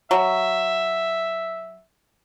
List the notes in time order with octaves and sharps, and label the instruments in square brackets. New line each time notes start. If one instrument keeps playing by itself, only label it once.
[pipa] F#3 [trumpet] E5